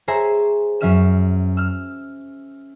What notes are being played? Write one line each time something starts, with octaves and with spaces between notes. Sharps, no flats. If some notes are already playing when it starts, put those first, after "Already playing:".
G#4 C5 C#5 E5 G#5 A#5
F#2 F#3 C#4 E5 F6 E7
E6 F6